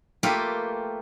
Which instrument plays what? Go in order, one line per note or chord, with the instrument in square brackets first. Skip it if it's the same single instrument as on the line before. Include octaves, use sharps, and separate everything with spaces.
[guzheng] A3 A#3 F4 G4 A4 B4